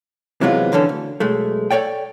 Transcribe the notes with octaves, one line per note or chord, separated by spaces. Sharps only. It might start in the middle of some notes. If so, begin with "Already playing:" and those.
C3 E3 F#3 G#3 B3 F4
F#2 D3 E3 C#4 A4
D2
B1 G#3 A3
A4 B4 C#5 D5 G5